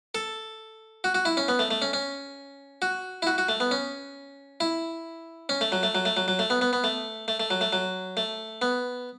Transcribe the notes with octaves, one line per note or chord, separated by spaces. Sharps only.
A4
F#4
F#4
E4
C#4
B3
A3
A3
C#4
C#4
F#4
E4
F#4
F#4
A3
B3
C#4
E4
C#4
A3
F#3
A3
F#3
A3
F#3
F#3
A3
B3
B3
B3
A3
A3
A3
F#3
A3
F#3
A3
B3